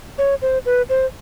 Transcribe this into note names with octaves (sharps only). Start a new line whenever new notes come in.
C#5
C5
B4
C5